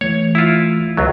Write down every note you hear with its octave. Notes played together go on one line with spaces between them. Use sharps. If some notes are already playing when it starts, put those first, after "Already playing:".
E3 A3 C#5
E4 F4
C#2 F#3